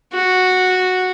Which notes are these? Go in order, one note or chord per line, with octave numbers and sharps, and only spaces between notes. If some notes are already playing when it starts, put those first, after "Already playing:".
F#4